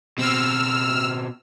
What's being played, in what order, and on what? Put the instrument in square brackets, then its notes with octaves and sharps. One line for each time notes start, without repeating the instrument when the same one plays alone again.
[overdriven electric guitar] B2 C4 [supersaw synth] E6 F6